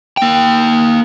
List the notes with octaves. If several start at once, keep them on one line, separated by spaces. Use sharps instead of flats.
A#3 G5